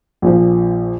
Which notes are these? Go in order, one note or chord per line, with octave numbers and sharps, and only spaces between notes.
A#1 A#2 F3